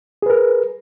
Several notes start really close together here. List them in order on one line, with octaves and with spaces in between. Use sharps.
G#4 B4 A#4